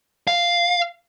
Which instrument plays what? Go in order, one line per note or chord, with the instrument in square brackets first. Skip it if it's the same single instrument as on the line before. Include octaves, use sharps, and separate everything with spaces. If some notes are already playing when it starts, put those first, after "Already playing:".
[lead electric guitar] F5